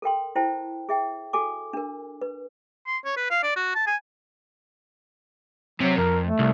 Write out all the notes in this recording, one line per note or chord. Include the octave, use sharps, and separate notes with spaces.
A4 A#4 G5 C6
E4 C5 G5 A5
G#4 E5 G5
F#4 A4 G#5 D6
D4 A#4
B4
C6
C#5
B4
F5
D5
F#4
A5
G#5
C3 F#3
F2 A#4
A3
C2